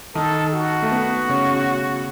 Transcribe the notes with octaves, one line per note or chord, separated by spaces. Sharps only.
D#3 D#4 A4
F#4
A3
B3
C#3 C#4